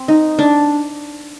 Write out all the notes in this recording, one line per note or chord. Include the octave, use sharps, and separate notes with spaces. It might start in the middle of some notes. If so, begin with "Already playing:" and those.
Already playing: C4
D#4
D4